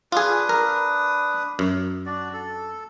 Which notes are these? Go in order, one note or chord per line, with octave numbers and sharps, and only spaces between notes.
D4 F4 G#4 B4 D#6
A#4
F#2
D4 F#4 D5
A4